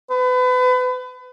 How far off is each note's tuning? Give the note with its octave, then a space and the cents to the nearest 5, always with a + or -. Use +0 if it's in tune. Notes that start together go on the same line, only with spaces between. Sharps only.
B4 +30